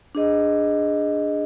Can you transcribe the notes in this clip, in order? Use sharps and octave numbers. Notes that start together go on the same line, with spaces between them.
D4 G#4 D#5